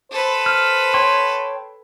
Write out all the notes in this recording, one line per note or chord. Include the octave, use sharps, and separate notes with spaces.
A4 B4 C5
F6
C#5 G5 C6